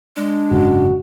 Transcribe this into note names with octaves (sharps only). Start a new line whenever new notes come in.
G#3 D4
F#1 G#2 C#3 F#4